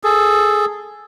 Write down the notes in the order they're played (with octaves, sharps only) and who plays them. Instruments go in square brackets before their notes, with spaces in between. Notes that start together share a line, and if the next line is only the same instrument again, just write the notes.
[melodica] G#4 A4